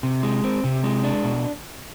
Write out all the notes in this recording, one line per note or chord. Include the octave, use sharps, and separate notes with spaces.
C3
G#3
C4
C3
G#3
D4
B2